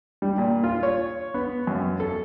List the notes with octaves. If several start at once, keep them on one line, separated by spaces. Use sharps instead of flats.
G3
A#2
F4
C#5
B3
F#2
A4